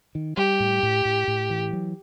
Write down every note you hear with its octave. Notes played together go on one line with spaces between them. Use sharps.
D#3
G3 G4
A2
A2
A2
A2
E3
F#3